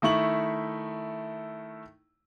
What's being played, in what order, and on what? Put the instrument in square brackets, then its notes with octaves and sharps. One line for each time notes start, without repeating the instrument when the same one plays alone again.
[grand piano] D#3 A3 E4 C#6 F#7